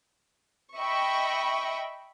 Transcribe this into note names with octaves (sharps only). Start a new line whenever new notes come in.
D#5 E5 G5 B5 C#6